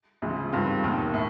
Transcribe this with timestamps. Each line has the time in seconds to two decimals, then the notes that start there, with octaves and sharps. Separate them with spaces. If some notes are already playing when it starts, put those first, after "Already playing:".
0.22 D2 C#3 F3 G#3
0.52 G2 D#3 G#3 C4 F4
0.83 E1 D#2 D#3
1.14 A2